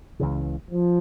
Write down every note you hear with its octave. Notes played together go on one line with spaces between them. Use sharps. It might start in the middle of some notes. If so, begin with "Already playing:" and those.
C#2 C#3 E3
F3